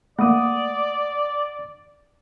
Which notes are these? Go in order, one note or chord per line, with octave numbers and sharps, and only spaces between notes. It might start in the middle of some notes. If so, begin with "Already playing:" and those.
A3 A#3 D5 F#5 D6 D#6